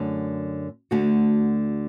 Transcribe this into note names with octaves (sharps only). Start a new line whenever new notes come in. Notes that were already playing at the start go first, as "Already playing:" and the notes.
Already playing: F#2 D3 A3
D2 D3 A3 F#4